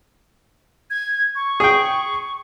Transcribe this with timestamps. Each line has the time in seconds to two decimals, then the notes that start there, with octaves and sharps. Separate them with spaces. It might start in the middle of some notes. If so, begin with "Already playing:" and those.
0.90 G#6
1.35 C#6
1.60 G#4 G5